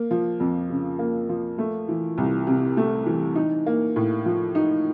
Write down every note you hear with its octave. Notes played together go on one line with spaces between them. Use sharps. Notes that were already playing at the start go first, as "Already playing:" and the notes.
Already playing: A#3
F3
F2
C#3
A#3
F3
A3
E3
C2
C3
A3
E3
D#4
A#3
A2
F3
D#4